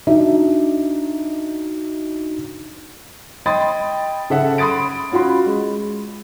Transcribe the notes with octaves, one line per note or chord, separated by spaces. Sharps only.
D4 D#4 F#4 E5
D#5 G5 B5 C6 D#6 A6
C#3 A4 E5 F#5
B5 C6 D#6 A6 D7
C#4 F4 F#4 B5 C6
G#3